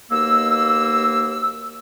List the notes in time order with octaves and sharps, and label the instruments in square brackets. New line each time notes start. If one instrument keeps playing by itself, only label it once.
[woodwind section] D#2 B2 A#3 E6